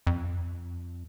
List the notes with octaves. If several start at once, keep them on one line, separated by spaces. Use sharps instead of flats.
F2